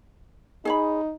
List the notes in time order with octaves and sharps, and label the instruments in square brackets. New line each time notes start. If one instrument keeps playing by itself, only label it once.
[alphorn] D#4 [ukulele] G#4 C#5 B5